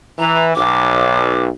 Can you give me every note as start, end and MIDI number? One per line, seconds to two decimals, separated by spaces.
0.19 0.54 52
0.19 0.44 82
0.55 1.48 35
0.55 1.42 86